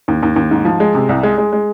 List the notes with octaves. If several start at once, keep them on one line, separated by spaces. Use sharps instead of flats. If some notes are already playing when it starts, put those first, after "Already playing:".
D#2
D#2
D#2
G#2
F3
G#3
C3
C2
G#3
G#3
G#3